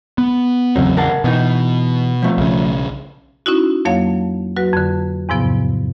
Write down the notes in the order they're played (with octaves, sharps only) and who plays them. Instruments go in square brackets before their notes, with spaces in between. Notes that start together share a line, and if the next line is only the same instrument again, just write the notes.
[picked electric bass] B3
[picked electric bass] A1 E2 C#3 [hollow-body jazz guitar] F#3 C4 A4
[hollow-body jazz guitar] A#4 F#5 A5
[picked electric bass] B2 [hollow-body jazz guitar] E3 D#4
[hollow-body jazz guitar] F3 A3
[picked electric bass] B1 C#3
[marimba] C#4 D#4 E4 F#4
F2 F#3 A#3 C#5 F5 A5
F#3 F#4 B4
F2 D3
E2 G#2 C3 F3 B3